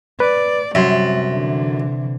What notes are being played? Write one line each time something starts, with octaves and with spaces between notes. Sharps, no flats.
B4 D5
F#2 C3 G3 E5 C6
D3 E3